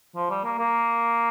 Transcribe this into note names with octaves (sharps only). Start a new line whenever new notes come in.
F3
G3
A#3
A#3